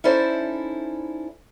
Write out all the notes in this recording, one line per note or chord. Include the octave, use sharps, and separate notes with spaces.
C#4 D#4 E4 A4 C5 D5